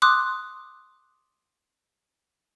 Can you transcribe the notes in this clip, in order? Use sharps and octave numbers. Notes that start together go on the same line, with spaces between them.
C6 D6 D#6 F#6